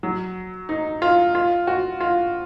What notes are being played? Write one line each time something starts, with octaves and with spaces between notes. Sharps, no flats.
F#3
D#4
F4
F4
F#4
F4